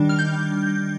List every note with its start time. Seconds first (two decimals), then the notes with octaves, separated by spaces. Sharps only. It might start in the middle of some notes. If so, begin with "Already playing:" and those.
Already playing: D#3 G3 D4
0.09 F6
0.19 G6